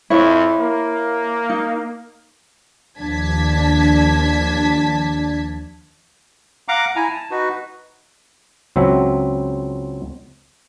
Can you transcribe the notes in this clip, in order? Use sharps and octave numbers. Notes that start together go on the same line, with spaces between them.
F2 E4 C#5
A#3
D#4
D#2 F3 D4 A5 G#6 B6
F5 F#5 A#5 D6
E4 G#5 A#5
A5
D#4 F#4 B4
C#2 F#3 C4 E5